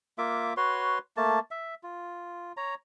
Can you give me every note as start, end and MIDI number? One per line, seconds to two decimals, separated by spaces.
0.18 0.53 58
0.18 0.53 65
0.18 0.53 76
0.18 0.53 86
0.57 0.98 66
0.57 0.98 71
0.57 0.98 73
0.57 0.98 84
1.17 1.39 57
1.17 1.39 58
1.17 1.39 81
1.51 1.75 76
1.83 2.52 65
2.57 2.75 73
2.57 2.75 82